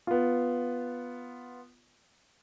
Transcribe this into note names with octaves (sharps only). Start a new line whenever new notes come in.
B3 F4